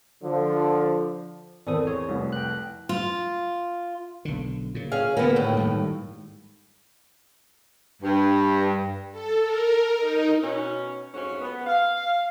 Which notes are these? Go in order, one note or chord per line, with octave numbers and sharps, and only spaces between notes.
D3 F3
G#1 E2 C4 A4 A#4 C5 D5 D#6
G#4 C#5
F1 C2
G5 F#6
F4
B1 D3
A#2 C#3
C#4 G#4 F5
A#2 D3 A#3 B3
D#2 A2
G#2 D#3 G3
G2
A4
A#4
D#4
B2 C#4
F2 G#2 F#3 C#4
B3
F5